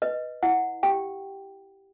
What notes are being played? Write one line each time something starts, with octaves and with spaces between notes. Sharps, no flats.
B4 D#5
E4 F#5
G4 G5